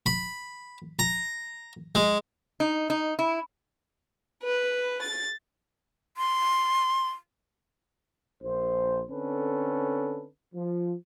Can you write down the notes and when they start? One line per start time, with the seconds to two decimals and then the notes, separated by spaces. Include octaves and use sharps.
0.06 B5
0.99 A#5
1.95 G#3
2.60 D#4
2.90 D#4
3.19 E4
4.44 B4
5.02 A6
6.17 C6
8.42 A#1 C5
9.09 D3 C4 C#4 A4 B4
10.54 F3